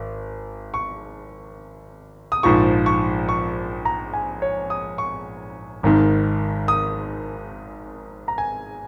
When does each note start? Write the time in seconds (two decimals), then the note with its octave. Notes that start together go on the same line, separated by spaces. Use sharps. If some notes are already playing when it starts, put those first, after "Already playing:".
Already playing: G#1
0.74 C#6
2.32 D#6
2.43 A#1 G#2 F3 C#6
2.86 C#6
3.29 C#6
3.85 A#5
4.13 G#5
4.42 C#5
4.70 D#6
4.98 C#6
5.83 G#1 G#2 D#3
6.68 D#6
8.28 A#5
8.38 G#5